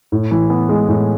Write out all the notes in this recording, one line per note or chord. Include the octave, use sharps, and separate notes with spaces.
A2
E3
B3
G#3
A2